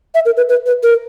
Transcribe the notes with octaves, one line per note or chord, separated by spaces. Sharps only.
E5
A#4
B4
B4
B4
A#4